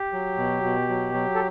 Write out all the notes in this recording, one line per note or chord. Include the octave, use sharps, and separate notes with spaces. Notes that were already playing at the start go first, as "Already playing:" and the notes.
Already playing: G4
F#3
B2
B2
F#3
F#3
A4